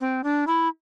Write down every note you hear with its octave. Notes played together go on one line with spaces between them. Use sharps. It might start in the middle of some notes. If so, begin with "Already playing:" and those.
C4
D4
E4